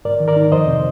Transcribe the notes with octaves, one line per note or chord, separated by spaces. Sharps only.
G#2 A#4 D5
D#3
A#4 D5
D#4
F2 C5 D#5
C3